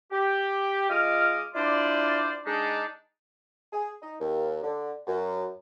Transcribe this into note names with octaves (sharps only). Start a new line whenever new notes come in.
G4
G#3 F4 D#5 D6 F6
D4 E4 F4 C5 D5
G#3 D4 D#4
G#4
D#4
D#2
D3
F#2